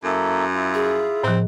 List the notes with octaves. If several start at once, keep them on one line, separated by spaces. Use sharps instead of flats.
F#2 A#3 E4 A4
E4 F4
G#4
A2 F3 C4